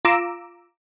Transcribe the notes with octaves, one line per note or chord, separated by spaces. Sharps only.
F4 A#5 D6 E6